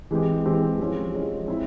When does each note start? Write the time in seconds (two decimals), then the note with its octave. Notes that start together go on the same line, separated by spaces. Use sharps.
0.11 E3 G#3 C4 G4
0.45 E3 G#3 C4 G4
0.79 F3 G#3 C#4
1.14 F3 G#3 C#4
1.48 C4 E4